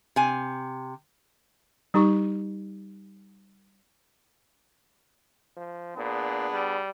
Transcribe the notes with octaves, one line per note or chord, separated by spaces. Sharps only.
C3 G#5
G3 D#4 G4 C#6
F3
A#2 B3 D4 G#4
G3